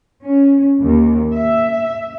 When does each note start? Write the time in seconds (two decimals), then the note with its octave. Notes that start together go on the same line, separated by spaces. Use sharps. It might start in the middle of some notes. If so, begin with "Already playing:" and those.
0.22 C#4
0.82 D#2
1.32 E5